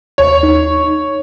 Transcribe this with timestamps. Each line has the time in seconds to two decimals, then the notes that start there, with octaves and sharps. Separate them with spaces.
0.18 D#2 C#5
0.43 D#4